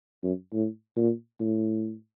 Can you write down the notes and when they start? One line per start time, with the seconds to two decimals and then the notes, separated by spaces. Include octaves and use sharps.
0.23 F#2
0.53 A2
0.96 A#2
1.40 A2